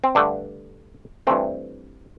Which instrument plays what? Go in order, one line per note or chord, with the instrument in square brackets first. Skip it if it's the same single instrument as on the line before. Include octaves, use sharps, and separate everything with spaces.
[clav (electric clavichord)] C4
G2 D3 A3 D4
G2 E3 A3 C4